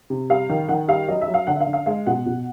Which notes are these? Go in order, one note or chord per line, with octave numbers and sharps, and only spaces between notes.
C3
G3 F5
D#3
D#3 F#5
G3 F5
F#3 D#5
E5
F#3
F5
D3 F#5
E5
F5
D3
F5
G#3 F5
B2 F#5
B2